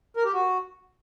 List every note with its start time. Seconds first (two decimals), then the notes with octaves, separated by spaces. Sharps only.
0.16 A#4
0.25 G4
0.33 F#4